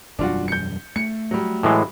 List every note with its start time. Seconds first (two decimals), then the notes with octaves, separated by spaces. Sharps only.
0.19 E1 F#2 G3 D4 F4 F#4
0.48 G6 C#7
0.96 A3 C#7
1.31 F#3 G3
1.63 A2 E3 G#3